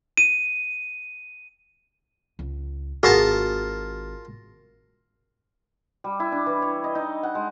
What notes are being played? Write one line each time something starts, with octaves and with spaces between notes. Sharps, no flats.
D#7
C#2
G#1 F4 F#4 G#4 A#4 A5
G3
E4
D4
E3
C#5
D#5
D#4
F#5
G#3